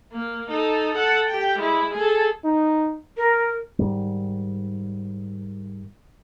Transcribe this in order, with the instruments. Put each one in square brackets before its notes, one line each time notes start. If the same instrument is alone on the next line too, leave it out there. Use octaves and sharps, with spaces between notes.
[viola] A#3
D#4 A4
A4 F#5
G4 G5
G#3 E4
G#4 A4
[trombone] D#4
[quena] A#4
[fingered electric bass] G#2 D#3 G3